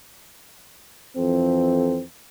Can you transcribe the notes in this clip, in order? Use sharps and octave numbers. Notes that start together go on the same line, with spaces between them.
F2 E3 C4 A4